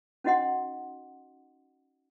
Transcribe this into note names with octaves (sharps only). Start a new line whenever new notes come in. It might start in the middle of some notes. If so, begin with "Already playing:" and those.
C#4 D#4 F#4 D#5 F#5 C6